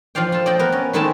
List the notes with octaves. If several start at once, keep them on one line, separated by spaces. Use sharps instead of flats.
F3 F4 D5 F5 G5
F4 A4
D5 D#5 G5
B3 A#4
C#4
D#3 G#3 A3 C4 E4 A5